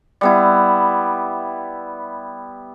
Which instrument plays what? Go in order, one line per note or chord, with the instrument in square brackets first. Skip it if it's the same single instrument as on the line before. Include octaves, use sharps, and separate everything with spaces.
[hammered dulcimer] G3 B3 E4